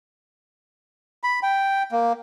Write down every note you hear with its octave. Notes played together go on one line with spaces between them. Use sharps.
B5
G5
A#3